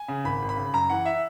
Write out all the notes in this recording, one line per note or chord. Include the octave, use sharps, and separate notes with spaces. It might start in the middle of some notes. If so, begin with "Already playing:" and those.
Already playing: G#5
C#3
G#1 B5
G#1
B5
C#3
F#2 A#5
E3 F#5
E5